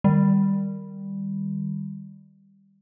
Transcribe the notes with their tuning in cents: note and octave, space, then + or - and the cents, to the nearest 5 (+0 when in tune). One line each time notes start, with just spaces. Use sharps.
D#3 -15 G3 +5